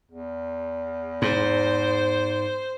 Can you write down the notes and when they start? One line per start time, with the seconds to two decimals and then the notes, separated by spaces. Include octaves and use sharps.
0.11 E2
1.22 G#2 C5